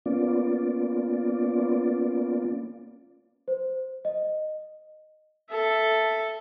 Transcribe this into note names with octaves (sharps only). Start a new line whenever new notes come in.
A#3 B3 C#4 F4 D5
C5
D#5
A4 E5